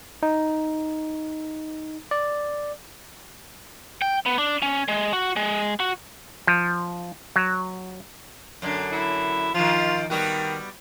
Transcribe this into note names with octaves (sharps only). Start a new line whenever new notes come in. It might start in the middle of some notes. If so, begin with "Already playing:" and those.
D#4
D5
G5
B3
D4
C#4
G#3
F#4
G#3
F#4
F3
F#3
F#2 D3
E4
D#3 F3 F4
D#3 G3 B3 F#4